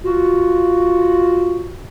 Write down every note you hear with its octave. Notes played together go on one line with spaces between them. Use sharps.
F4 F#4